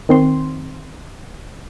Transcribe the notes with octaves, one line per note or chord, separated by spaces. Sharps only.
D#3 C4 C6